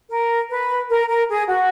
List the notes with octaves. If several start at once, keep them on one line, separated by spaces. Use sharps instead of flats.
A#4
B4
A#4
A#4
G#4
F#4